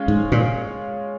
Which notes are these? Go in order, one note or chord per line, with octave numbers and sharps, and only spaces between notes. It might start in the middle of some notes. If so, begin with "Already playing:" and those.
Already playing: G#3 C#4 F4
G#2
A#2